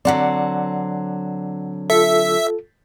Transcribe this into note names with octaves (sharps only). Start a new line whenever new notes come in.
D3 F#3 C4 D5 F#5
F4 A4 E5